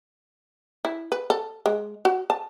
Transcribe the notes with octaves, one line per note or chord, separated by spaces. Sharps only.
E4
B4
A4
G#3
F#4
A5